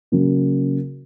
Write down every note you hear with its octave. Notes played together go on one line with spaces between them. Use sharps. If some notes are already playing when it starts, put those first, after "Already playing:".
C#3 F#3 A#3